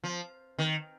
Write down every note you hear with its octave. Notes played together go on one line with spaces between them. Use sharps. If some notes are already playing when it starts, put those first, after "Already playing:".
F3
D#3